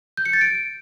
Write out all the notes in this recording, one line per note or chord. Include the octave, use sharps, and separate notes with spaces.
G6
C#7
A6
D7